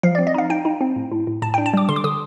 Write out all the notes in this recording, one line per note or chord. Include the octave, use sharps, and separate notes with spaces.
F3 F5
D5
C4
D#5
D#4 F5
D#4 G5
D#4
C4
A2
A2
A2
A2 A5
G5
D4
A5
G3 D6
D3 C6
D6
D3 D#6